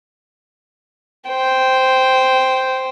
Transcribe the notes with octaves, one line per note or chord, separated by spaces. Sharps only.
C5 G5